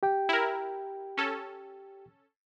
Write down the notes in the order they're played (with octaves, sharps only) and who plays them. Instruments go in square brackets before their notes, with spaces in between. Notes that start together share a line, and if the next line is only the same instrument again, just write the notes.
[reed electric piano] G4 G5
[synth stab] E4 A#4
C#4 A4